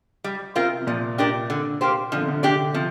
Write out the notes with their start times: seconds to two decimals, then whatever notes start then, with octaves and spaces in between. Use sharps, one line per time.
0.24 G3
0.56 C3 C4 F4 A#4
0.82 C3
0.87 A#2 F3
1.18 D4 G4 A#4 D5
1.50 D3
1.81 A#3 G4 C5
2.12 D3 F3
2.20 C3
2.28 D3
2.43 D3 D4 G4 D5
2.74 C3 F3